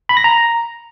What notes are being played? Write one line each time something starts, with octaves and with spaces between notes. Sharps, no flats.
B5
A#6
A#5